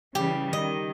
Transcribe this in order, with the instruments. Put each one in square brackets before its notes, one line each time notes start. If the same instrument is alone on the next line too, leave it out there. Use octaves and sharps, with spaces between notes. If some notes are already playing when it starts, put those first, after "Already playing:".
[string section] C#3 E3 G3 [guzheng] G4
[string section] D#3 [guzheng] D#5